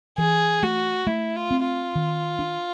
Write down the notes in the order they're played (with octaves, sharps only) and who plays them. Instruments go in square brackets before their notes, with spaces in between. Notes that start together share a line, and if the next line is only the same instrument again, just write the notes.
[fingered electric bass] E3 [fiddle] G#4
[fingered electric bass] A3 [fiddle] F#4
[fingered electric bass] A3 [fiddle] E4
[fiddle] F4
[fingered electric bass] C4
[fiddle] F4
[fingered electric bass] D#3
D4